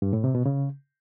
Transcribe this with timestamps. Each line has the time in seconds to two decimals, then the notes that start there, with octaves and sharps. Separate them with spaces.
0.02 G2
0.13 A2
0.24 C3
0.35 B2
0.46 C#3